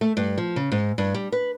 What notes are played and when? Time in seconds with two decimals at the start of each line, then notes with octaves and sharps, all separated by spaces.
0.01 A3
0.17 G2
0.38 F3
0.56 C#3
0.72 G#2
0.98 G2
1.14 G3
1.32 B4